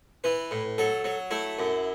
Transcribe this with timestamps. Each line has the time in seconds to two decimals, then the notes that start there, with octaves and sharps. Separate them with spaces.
0.24 E3 B4
0.51 A2
0.78 F#3 A4
1.04 F#3
1.31 A3 E4
1.59 F#2